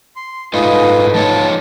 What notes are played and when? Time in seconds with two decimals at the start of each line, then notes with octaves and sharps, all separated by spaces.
0.16 C6
0.54 G#2 A3 D#4 F4 B4 D#5
1.14 F3 D#4 C#5 A5